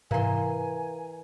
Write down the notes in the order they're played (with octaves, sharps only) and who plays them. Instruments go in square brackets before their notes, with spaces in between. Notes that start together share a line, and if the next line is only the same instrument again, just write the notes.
[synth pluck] G#2 C3 [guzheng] E3 C6 [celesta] A#4 F5 A#5 [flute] G#5